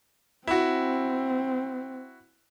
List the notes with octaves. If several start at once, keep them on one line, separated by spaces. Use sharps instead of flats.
C4 E4 F#4